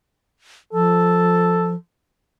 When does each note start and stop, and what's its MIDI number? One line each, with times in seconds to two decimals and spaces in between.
0.73 1.75 53
0.73 1.73 69